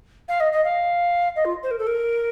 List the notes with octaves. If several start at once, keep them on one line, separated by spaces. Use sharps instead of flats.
F5
D#5
D#5
F5
D#5
F4
C5
A#4
A4
A#4